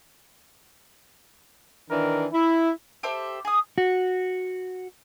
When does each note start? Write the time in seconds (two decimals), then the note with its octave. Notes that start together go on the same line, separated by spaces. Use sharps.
1.90 D#3 E3 D4 A#4
2.33 E4
3.03 G4 A4 C5 E5
3.45 G#4 D#6
3.78 F#4